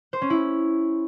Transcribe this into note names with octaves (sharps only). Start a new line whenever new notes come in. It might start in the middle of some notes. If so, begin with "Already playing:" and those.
C5
C#4
E4